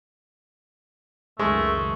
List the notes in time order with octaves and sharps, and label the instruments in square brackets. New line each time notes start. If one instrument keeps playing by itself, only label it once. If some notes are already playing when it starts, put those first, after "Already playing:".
[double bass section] C#2 F#2 D#3 [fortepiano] G#3 [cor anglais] A3 [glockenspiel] C#6